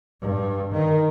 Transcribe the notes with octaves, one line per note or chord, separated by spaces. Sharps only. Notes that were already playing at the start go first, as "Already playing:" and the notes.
G2
D#3